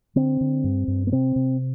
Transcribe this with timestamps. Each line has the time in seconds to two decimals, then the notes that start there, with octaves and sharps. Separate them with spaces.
0.16 D3 C4
0.41 D3
0.64 G2
0.88 G2
1.07 B3
1.12 C3 C4
1.36 C3